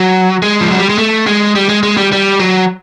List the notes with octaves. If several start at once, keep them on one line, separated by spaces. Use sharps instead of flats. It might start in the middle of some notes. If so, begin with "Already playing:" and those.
Already playing: F#3
G#3
F3
F#3
G3
G#3
A3
G#3
G3
G#3
G#3
G3
G3
F#3